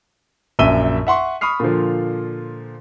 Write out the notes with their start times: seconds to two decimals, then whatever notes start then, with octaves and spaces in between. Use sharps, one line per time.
0.59 A#1 F#2 E5 E6 D#7 G7
1.07 E5 F#5 C6 C#6
1.41 B5 C#6 D#6 F6 C7
1.60 A#2 D3 F3